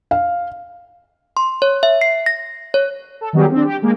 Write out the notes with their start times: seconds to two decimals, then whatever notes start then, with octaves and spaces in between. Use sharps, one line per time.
0.11 F5
1.37 C6
1.62 C#5
1.83 E5
2.01 C7
2.26 A#6
2.74 C#5
3.21 A4
3.33 D#3 F#3 G3 B3 G4 G#4
3.51 C4 D4
3.65 G4
3.82 G#3 A#3